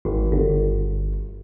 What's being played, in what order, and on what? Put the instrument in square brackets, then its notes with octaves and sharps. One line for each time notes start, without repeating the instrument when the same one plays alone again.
[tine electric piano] G#1
G1